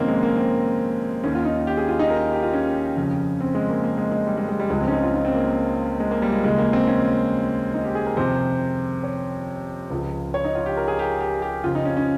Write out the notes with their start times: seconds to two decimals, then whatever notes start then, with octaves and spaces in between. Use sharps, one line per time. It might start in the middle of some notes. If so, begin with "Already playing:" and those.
Already playing: F2 C3 D#3 A#3 C4 C#4 D#4
0.08 G#3
0.23 A#3
0.37 C4
1.23 D#2 D#3 C#4
1.35 F4
1.45 D#4
1.67 G4
1.77 G#4
1.88 F4
1.99 D#4
2.10 A#4
2.32 G4
2.43 F4
2.54 C#4
2.97 F2 C#3 F3
3.41 C4
3.55 G#3
3.70 A#3
3.84 A#3
3.98 G#3
4.12 G#3
4.27 G3
4.38 G#3
4.48 G#3
4.60 G3
4.70 C#2 C#3 F3 G#3
4.81 C4
4.88 C#4
4.92 D#4
5.03 F4
5.14 D#4
5.25 C4
5.35 A#3
6.00 G#3
6.11 A#3
6.22 G3
6.33 G#3
6.43 D#2 C#3 F3 G#3
6.58 A#3
6.73 C4
6.87 C#4
7.74 D#4
7.85 G4
7.95 G#4
8.06 A#4
8.17 F2 C3 D#3 C5
9.03 C#5
9.90 C#2 C#3 F3
10.34 C#5
10.45 D#4
10.55 F4
10.66 G4
10.77 A#4
10.88 G#4
10.99 G4
11.21 G4
11.42 G4
11.64 F2 C#3 F3 F4
11.75 D#4
11.85 C#4
11.97 C#4